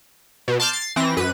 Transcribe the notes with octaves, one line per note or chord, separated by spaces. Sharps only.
B2
A5 C6 D6 F6 G6
A6 C7
E3 C4 A#6
F#2 B4 D#7